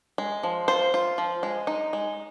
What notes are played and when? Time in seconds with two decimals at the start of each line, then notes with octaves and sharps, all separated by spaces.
0.18 G#3
0.43 F3
0.68 F4 C5
0.94 F4
1.18 F3
1.43 G#3
1.67 D#4
1.93 G#3